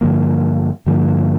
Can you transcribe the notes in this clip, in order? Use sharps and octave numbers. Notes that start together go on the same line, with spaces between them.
G2 D3 F3 A#3
G2 D3 F3 A#3